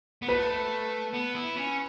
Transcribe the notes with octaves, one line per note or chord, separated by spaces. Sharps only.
B3
A3 B4
B3
E4
C#4